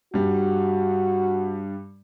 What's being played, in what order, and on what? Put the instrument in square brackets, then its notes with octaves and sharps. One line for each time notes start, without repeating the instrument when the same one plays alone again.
[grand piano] G2 G3 [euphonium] F#4